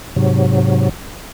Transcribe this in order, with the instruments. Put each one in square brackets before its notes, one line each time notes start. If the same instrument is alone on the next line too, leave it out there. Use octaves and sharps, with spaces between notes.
[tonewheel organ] G#2 C3 F#3